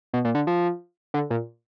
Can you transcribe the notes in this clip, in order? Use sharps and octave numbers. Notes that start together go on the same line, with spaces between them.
B2
A#2
D3
F3
D3
A#2